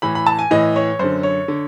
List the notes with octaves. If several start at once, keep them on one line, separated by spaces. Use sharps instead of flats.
A2 E3 B5
B5
A5
G#5
A2 E3 D#5
C#5
F#2 D3 C5
C#5
D3